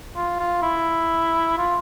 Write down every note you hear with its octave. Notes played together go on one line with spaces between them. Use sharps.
F4
F4
E4
F4